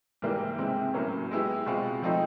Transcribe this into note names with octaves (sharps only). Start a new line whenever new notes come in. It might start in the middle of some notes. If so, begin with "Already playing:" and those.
G#2 E3 G3 A#3
C3 E3 G#3 C4
A2 F#3 A#3 C#4
G#3 B3 E4 G4
B2 G#3 C4 F4
F3 A3 C4 D#4